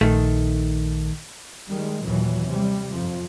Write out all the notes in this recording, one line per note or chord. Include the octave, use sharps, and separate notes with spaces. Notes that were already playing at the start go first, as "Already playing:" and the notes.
A#1 D#3 A3
D#3 G3 G#3
D#2 A#2 E3 F#3
C3 G3
F2 F3